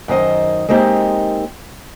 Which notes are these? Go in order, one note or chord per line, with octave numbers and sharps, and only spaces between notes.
F#2 D#3 C5 D#5
G#3 A#3 C4 D#4 G4